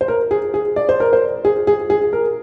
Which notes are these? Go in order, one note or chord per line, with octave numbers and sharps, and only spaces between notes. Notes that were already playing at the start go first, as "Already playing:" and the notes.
C5
A#4
G#4
G#4
D5
C5
A#4
C5
G#4
G#4
G#4
A#4